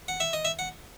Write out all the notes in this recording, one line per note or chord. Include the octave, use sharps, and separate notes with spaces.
F#5
E5
D#5
E5
F#5